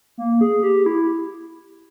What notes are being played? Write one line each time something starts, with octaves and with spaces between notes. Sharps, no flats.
A#3
G#4
G4
E4